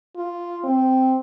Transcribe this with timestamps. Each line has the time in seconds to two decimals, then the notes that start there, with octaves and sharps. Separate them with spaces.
0.16 F4
0.64 C4